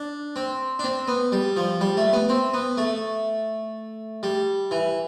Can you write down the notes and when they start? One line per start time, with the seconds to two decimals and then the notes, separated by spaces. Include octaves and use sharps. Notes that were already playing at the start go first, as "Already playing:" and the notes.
Already playing: D4
0.36 C4
0.79 D4
0.84 C4
1.08 B3
1.32 G3
1.56 F3
1.81 G3
1.97 A3
2.13 B3
2.29 C4
2.54 B3
2.77 A3
4.23 G3
4.71 E3